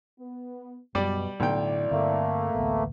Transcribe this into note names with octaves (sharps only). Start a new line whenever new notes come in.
B3
F#2 B2 G3 D5
B1 A2 D3 E4 D5 G5
G2 D3 A3 A#3 C4
A1 D2 B3